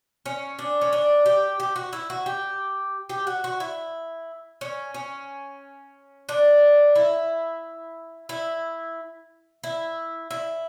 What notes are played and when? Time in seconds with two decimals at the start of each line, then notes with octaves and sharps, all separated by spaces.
0.26 C#4
0.59 D4
0.81 C#4
0.93 D4
1.26 G4
1.60 G4
1.76 F#4
1.93 E4
2.10 F#4
2.26 G4
3.10 G4
3.27 F#4
3.44 F#4
3.60 E4
4.61 C#4
4.94 C#4
6.29 D4
6.96 E4
8.29 E4
9.64 E4
10.31 E4